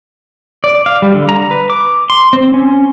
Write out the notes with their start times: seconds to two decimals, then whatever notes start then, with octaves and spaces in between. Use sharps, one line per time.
0.64 D5
0.86 F5
1.02 G3
1.14 D3
1.29 A#5
1.51 B4
1.70 D6
2.10 C6
2.33 C4
2.54 C#4